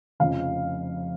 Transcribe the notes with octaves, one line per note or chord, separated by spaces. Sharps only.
F1 F2 C#3 F5